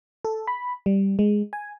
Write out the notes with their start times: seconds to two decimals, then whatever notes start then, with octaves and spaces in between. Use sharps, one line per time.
0.25 A4
0.47 B5
0.86 G3
1.19 G#3
1.53 G#5